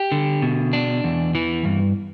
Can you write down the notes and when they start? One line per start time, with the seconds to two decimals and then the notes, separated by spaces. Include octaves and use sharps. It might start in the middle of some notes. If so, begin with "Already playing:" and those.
Already playing: G4
0.12 D3
0.42 B2
0.73 D4
1.04 E2
1.35 E3
1.65 G2